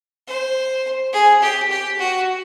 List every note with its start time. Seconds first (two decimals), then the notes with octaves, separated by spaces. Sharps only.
0.27 C5
1.13 G#4
1.42 G4
1.70 G4
1.99 F#4